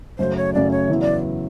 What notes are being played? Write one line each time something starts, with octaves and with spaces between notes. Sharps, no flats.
F#2 C#3 F#3 A3 C5
C#5
F#2 C#3 F#3 A3 D5
C#5
E2 C#3 F#3 B3 E4
D5